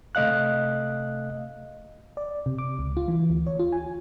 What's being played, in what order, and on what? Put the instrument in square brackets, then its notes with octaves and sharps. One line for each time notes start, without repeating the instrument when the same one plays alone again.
[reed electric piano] C3 A3 D#5 F5 F#6
[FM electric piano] D5
C3
D6
C#2
F4
E3
D2
C#5
F4
G#5